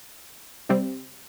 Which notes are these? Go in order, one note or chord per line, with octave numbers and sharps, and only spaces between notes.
C3 G3 C4